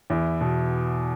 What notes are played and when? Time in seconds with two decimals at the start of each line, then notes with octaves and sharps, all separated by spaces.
0.10 E2 E4
0.41 B2